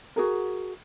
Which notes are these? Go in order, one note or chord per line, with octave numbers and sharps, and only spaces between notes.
F#4 G#4 A#4